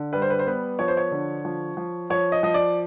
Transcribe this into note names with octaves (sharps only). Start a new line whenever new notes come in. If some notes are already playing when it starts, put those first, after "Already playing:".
Already playing: D3
G3 B4
C5
B4
C5
B3 B4
F3 C#5
C5
C#5
D3
F3
F3
F3 C#5
D#5
F3 D#5
D5